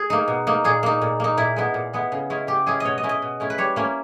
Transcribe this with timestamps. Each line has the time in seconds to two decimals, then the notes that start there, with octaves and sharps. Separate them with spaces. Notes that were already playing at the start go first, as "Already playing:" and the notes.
Already playing: G#4
0.10 A#3 D#4
0.28 B2
0.47 A#3 D#4
0.64 A#2 G#4
0.83 A#3 D#4
1.02 A#2
1.20 A#3 D#4
1.37 A#2 E4
1.56 G#3 B3 E4
1.74 A#2
1.93 G#3 B3 E4
2.12 C#3
2.30 G#3 C#4 E4
2.47 C#3 G4
2.66 G#3 C#4 E4 G#4
2.80 B2 C#5 D#5
2.98 D#5
3.03 G#3 C#4 E4
3.09 D#5
3.22 B2
3.40 G#3 C#4 E4
3.50 B4
3.58 G3 C#5
3.76 A#3 C#4 E4